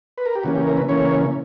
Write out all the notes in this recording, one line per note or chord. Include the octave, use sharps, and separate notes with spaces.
B4
A#4
G4
C#3 E3 A#3 C#4 F#4
G4
A#4
B4
C#3 E3 A#3 C#4 C#5